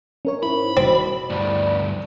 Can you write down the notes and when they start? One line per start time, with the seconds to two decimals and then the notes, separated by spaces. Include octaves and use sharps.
0.25 C#4 A#4 C#5
0.43 G#2 E4 B5
0.77 B2 C4
1.30 D2 G2 G3